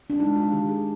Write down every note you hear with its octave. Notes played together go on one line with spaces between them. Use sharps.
D4
G#3 D#4
F4
D#3 G4
G#4